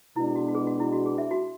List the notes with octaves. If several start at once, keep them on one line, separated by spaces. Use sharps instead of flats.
B2 G#3 B3 D4 E4
F#4
F#4
G#4
F#4
E4
F#4
G#4
E5
F#4